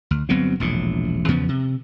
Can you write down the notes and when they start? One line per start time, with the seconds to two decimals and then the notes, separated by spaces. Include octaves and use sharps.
0.11 D2
0.29 G1 F#3 B3 C4
0.60 E1 A#1 A2
1.28 E2 C#3 F3 B3
1.48 C3